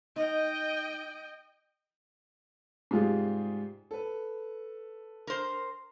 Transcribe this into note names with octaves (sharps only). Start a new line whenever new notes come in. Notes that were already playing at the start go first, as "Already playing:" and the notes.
D#4 D#5 G5
G#2 C3 G3 F4 G4 G#4
A4 B4
A#4 C5